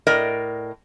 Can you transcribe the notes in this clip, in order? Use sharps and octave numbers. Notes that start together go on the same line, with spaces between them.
A2 A#4 D5 D#5